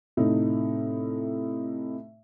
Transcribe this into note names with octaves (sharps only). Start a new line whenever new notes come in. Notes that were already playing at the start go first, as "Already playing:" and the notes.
A2 C3 A3 D#4